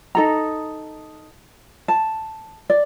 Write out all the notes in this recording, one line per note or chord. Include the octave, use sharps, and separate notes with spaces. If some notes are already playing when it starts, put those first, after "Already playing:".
D#4 A4 A#5
A5
D5